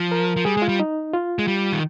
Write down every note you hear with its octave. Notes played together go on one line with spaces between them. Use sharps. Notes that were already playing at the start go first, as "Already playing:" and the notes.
Already playing: F3
A#4
F3
G3 G#4
G#3 F4
G3
D#4
F4
G#3
G3
D#3